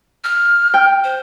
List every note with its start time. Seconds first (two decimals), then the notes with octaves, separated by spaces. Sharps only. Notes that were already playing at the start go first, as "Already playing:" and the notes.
0.24 F6
0.74 G5
1.04 C5